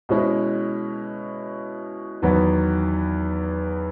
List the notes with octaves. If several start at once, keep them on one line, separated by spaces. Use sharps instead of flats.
B2 G#3 C#4 E4
E2 D#3 F#3 B3